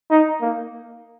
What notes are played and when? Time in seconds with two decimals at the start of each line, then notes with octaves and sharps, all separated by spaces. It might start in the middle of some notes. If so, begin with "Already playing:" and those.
0.11 D#4
0.41 A#3